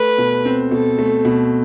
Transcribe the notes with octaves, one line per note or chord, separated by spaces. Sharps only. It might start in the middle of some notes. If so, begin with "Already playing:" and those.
Already playing: A3 B4
B2
C4
B2 A4
A3
B2